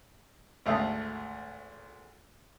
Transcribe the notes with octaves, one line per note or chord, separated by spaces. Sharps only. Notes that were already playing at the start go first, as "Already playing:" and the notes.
G#1 D2 A3 F5 D#6